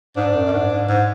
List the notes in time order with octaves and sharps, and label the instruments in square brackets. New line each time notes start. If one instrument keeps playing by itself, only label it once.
[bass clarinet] G#2 [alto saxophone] D4
[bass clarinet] G#2
F#2
F#2
G#2
G#2
G#2